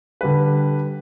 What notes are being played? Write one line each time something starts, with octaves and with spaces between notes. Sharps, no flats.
D3 G3 B4